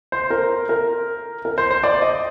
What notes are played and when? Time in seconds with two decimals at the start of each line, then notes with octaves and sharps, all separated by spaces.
0.12 C5
0.31 A#4
0.69 A#4
1.45 A#4
1.58 C5
1.71 C5
1.84 D5
2.02 D#5